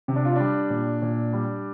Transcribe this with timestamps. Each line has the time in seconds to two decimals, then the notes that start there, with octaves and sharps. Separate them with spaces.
0.08 C3
0.16 D4
0.25 F4
0.36 G3 D4
0.70 A#2
1.02 A#2
1.33 G3